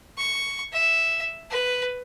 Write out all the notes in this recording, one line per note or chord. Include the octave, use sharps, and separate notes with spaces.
C#6
E5
B4